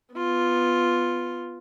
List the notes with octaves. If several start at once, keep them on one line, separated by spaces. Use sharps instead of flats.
B3 F4